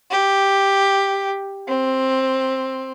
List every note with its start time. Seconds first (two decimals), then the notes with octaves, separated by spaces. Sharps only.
0.11 G4
1.68 C4